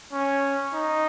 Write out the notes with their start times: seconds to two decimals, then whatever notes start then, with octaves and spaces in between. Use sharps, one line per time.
0.13 C#4
0.74 D#4